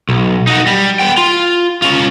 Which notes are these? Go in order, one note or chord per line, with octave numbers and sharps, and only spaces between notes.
B1
D#4 F#4
G3
B3 G5
F4
C#4 F4